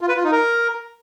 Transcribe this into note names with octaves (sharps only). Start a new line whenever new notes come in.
F4
B4
F4
D#4
A#4